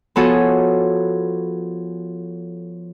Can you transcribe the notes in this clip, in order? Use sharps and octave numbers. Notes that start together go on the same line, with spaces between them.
F3 B3 F#4 G#4 A4 C#5